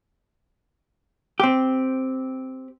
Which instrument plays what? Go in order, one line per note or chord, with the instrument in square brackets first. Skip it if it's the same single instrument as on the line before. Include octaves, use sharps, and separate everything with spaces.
[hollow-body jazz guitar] C4 G4